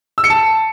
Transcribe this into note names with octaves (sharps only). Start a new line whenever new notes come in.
E6
C#7
A5